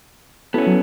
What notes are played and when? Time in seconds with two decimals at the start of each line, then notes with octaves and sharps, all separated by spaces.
0.54 B3 C#4 E4 F#4 A4
0.66 F#3